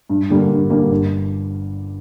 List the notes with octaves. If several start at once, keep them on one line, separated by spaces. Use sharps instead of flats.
G2
D3 G3 A#3
G2
D3 G3 A#3
G1